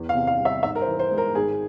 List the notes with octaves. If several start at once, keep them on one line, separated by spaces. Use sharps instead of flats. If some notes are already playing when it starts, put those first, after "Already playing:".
Already playing: E2
F5
C3
F5
G3
E5
G#2 E5
A#4
C5
E3
C5
G#3
A#4
G#1 G#4